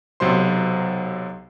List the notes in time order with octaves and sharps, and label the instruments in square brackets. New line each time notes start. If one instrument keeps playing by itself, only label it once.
[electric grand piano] B1 C3 F#3 C5 C6